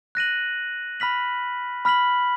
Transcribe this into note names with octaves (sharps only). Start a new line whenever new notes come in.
F#6 A#6 D#7 F#7
B5 F6 B6 F#7
B5 F6 B6 F#7